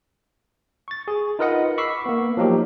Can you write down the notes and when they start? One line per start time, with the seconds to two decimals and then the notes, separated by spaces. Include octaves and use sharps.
0.88 C#6 A6
1.08 G#4
1.39 D#4 F4 A#4 B4 D#5 F#5
1.78 B5 C#6 D6 E6 B6 C7
2.06 A#3 B3
2.37 F3 F#3 A#3 D#4 G4